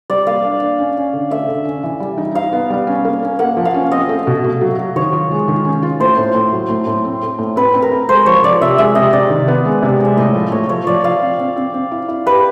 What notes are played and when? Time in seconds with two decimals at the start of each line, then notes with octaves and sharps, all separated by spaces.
0.10 G3 D5
0.27 A#3 F5
0.44 D4
0.61 D4
0.78 C#4
0.96 C#4
1.13 D3
1.31 A3 E5
1.48 D3
1.65 C#4
1.83 E3
2.00 G3
2.18 D#4
2.35 D#4 F5
2.53 B3
2.70 G3
2.87 C#4
3.05 A#3
3.23 C#4
3.39 A#3 F#5
3.57 F3
3.65 F5
3.74 C#4
3.92 C4 D#5
4.09 A3
4.27 B2
4.44 A3
4.61 F#3
4.79 F#3
4.96 D#3 C#5
5.13 F4
5.31 G#3
5.48 D#3
5.65 C#4
5.82 F4
6.00 A2 C5
6.18 A2
6.35 A2
6.52 F#3
6.69 A2
6.87 A2
7.05 C4
7.22 A3
7.39 A2
7.56 C4 B4
7.74 C4
7.82 A#4
7.91 A3
8.09 G#3 C5
8.26 F3 C#5
8.43 F3 D5
8.61 C3 E5
8.78 G#3 E5
8.95 C3 D#5
9.13 C3 D5
9.30 D#3
9.48 B3
9.65 G#3
9.82 C3
10.00 G#3
10.05 E5
10.17 A2 D#5
10.34 F3
10.52 A2 C#5
10.69 F3 C#5
10.87 F3 D5
11.04 F3 F5
11.21 C4
11.39 C4
11.56 C4
11.74 C4
11.91 E4
12.08 E4
12.26 G4 B4